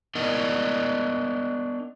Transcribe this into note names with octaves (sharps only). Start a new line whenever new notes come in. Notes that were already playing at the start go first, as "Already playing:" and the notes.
B3 D4 A#4 D5 D#5